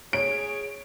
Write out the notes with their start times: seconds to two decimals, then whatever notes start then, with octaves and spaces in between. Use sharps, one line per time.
0.13 G#4 C#5 D7